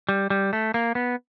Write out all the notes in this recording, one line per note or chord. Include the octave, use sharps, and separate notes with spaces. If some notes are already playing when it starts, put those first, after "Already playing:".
G3
G3
A3
A#3
B3